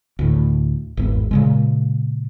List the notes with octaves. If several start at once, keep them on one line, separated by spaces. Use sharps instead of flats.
D2 A2
G#1 E2
A#2 C#3 G#3